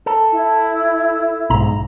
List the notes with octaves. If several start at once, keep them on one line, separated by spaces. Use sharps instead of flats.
A4
E4
B1 G#2 A#5